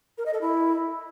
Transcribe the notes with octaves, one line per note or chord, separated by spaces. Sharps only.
A#4
D#5
A4
E4